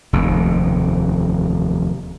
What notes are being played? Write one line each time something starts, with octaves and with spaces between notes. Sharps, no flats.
F1 D#2